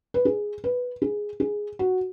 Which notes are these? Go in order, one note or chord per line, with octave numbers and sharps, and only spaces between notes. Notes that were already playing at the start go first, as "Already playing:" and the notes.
B4
G#4
B4
G#4
G#4
F#4